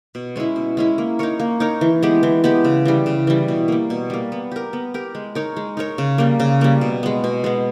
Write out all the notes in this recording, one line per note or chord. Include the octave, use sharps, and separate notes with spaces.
B2
G#3 C#4 E4
B2
G#3 C#4 E4
A#3
D#4 A#4 C#5
A#3
D#4 A#4 C#5
E3
G#3 B3 G4
E3
G#3 B3 G4
C#3
E3 G3
C#3
E3 G3
B2
G3 A#3
B2
G3 A#3
B3
G4 A#4
B3
G4 A#4
G#3
D#4 A#4 C#5
G#3
D#4 A#4 C#5
C#3
G3 A#3
C#3
G3 A#3
B2
G#3 B3
B2
G#3 B3